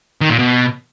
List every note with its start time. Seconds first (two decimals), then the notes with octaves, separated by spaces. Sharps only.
0.21 D#3
0.30 A#2
0.39 B2